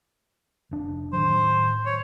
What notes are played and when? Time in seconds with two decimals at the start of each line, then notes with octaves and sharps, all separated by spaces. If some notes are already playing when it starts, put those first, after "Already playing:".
0.71 F1 D4
1.13 A2 D#3 F#3 C5
1.85 C#5